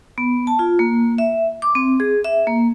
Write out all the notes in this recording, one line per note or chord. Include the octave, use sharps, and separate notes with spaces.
B3
A5
F4
A#3
E5
D6
C4
G#4
E5
A#3